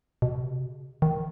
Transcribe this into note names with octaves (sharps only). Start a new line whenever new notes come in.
B2
C3
C#3
D#3